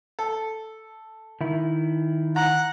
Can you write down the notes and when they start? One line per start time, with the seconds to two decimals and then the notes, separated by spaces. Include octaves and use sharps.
0.19 A4
1.41 D#3 E4
2.36 F#5 A#5